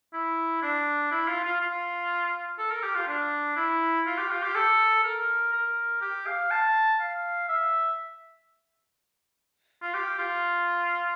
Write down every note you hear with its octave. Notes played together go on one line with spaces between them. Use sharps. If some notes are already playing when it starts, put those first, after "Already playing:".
E4
D4
E4
F4
F4
F4
A4
A#4
G4
F4
D4
E4
F4
G4
F4
G4
A4
A#4
A#4
G4
F5
A5
F5
E5
F4
G4
F4